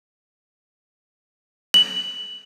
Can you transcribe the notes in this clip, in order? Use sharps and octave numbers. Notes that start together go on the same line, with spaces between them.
F#7